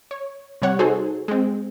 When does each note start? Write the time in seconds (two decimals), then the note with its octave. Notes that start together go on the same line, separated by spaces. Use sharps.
0.11 C#5
0.62 C3 G3 C#5 F#5
0.79 D#4 F#4 G#4 A4 C5
1.28 G#3 C4